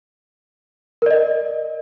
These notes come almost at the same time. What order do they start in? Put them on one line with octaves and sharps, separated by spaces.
A#4 D5 D#5